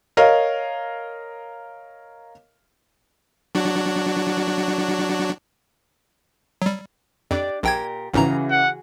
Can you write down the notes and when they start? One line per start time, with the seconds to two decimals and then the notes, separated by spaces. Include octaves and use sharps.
0.17 A#4 C#5 D#5 F5
3.55 F#3 D4 F#4
6.62 F#3 G3
7.31 F2 D4 G4 D5
7.63 A#1 A#2 G4 A#4 G5 G#6
8.14 G#1 G#2 C#3 E3 F#4 G#4 A#5
8.50 F#5